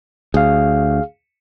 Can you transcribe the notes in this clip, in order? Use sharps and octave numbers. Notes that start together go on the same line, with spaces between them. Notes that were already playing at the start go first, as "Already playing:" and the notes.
D2 G#4 F5